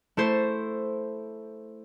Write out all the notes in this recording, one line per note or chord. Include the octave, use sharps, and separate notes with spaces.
A3 E4 A4 C5